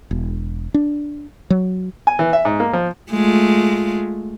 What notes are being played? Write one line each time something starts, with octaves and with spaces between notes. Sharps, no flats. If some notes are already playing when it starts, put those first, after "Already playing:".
E1
D4
F#3
G#5
E3
E5
G#2
A#3
F3
G#3 A3 F4